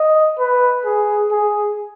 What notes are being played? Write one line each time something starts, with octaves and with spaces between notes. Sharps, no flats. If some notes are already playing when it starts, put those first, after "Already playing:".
Already playing: D#5
B4
G#4
G#4